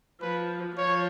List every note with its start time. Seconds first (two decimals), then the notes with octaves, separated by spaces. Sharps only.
0.21 F3 B4
0.77 F3 C#5